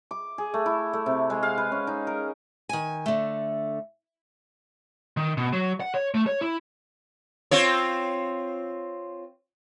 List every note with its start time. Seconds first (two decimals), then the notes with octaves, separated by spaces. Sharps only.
0.11 D6
0.38 G#4
0.54 A3
0.66 E4
0.93 A3
1.06 C3
1.30 G#3
1.43 F5
1.58 B4
1.72 C#4
1.87 D#4
2.07 A#4
2.69 D#3 G#5
3.06 D3 A3
5.17 D#3
5.37 B2
5.53 F#3
5.80 F#5
5.94 C#5
6.14 A3
6.27 C#5
6.41 E4
7.51 C4 F4 C#5